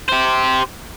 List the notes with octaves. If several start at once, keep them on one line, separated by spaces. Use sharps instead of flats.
G4 C5